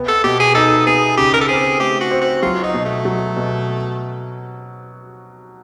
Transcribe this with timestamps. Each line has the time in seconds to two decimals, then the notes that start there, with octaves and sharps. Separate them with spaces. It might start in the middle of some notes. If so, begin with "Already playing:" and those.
Already playing: C3 B3
0.08 A4
0.24 B2 G4
0.40 G#4
0.55 D#4 A4
0.87 B3 G#4
1.18 C#3 G4
1.34 A#4
1.41 A4
1.49 C4 G#4
1.80 A3 G4
2.00 F#4
2.11 C4
2.21 F#4
2.42 F#3 F4
2.63 D#4
2.74 B2
2.85 A3
3.05 F#3
3.37 B2